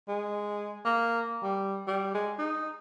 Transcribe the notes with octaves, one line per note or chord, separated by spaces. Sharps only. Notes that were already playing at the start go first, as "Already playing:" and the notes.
G#3
A#3
G3
G3
G#3
D#4